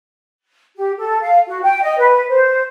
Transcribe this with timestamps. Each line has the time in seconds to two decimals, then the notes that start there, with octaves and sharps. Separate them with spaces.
0.77 G4
0.97 A4
1.22 F5
1.48 F#4
1.62 G5
1.82 D#5
1.98 B4
2.28 C5